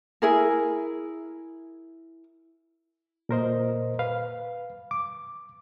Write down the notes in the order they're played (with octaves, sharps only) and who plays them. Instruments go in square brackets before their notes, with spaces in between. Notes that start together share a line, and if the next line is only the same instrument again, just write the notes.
[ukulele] E4 G#4 A#4
[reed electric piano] A#2 A#4 C5 D#5
B4 F5
D6